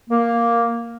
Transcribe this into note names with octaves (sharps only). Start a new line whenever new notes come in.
A#3